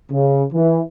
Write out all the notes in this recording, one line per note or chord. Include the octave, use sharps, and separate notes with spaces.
C#3
E3